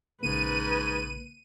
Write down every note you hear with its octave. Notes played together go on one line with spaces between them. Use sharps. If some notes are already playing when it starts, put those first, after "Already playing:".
A#1 G#2 C#3 A#3 B4 D#7